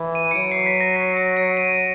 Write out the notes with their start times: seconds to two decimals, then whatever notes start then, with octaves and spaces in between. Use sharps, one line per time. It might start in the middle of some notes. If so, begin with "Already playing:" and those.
Already playing: E3
0.15 D#7
0.31 C#7
0.35 F#3 D7
0.51 C7
0.66 B6
0.81 A#6
0.96 C7
1.17 C#7
1.37 D7
1.57 D#7